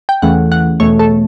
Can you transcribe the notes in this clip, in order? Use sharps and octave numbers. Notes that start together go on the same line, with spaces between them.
G5
E2 C#3 E3 A3 F#5
F#5
E2 B2 A3 C#5
A4